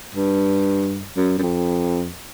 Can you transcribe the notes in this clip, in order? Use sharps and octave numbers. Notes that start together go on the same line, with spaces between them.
G2
F#2
F#2
F2